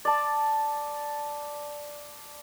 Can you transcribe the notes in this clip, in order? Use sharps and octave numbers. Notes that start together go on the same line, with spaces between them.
D5 A5